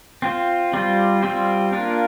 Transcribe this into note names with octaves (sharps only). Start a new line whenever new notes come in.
C4 F4 C5
G3 C4 F4 C5
G3 C4 F4 C5
A#3 D4 F4 A#4